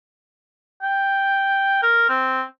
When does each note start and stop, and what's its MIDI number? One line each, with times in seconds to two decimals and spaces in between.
0.82 1.81 79
1.83 2.05 70
2.09 2.43 60